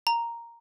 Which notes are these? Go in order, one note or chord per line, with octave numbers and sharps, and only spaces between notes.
A#5